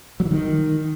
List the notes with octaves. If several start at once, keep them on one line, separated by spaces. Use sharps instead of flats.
F#3
E3
D#3